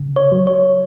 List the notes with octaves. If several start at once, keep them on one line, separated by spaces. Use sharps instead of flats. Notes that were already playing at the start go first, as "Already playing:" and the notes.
Already playing: C#3
C#5
F#3
C#5